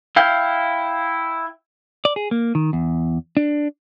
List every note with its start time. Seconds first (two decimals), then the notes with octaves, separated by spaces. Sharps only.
0.16 E4 F5 G5
2.05 D5
2.16 G#4
2.31 A#3
2.55 D#3
2.73 E2
3.37 D4